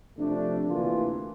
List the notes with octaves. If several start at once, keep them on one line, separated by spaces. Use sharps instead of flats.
C3 F3 A3 D4
D2 C3 E3 A#3 F4